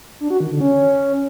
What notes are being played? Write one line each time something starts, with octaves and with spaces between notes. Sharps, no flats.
D4
F#4
D#3
D3
C#4